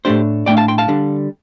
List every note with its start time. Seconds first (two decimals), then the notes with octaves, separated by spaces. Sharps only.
0.05 A2 A3 D4 G4 C5
0.46 A2 A3 D4 D5 G5
0.57 F5 A5
0.68 G5 C6
0.78 F5 A5
0.88 D3 G3 D4